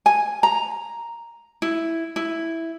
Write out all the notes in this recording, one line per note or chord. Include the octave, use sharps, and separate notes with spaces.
G#5
A#5
E4
E4